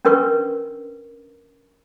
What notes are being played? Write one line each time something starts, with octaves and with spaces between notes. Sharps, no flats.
C#4 D4 A#4 B4 C#6